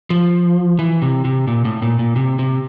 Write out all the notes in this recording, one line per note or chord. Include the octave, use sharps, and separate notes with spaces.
F3
E3
C3
C3
A#2
A2
A#2
A#2
C3
C3